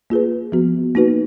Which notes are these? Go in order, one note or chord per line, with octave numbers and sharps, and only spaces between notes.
A#3 F4 G#4 B4
F3 B3 F#4
A#3 D#4 F#4 B4